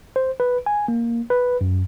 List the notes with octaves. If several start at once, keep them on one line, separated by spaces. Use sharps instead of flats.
C5
B4
G#5
A#3
B4
F#2